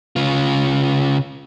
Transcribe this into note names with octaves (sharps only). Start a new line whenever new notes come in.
C#3 F4